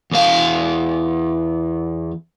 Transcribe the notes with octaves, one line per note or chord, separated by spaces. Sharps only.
E2 F5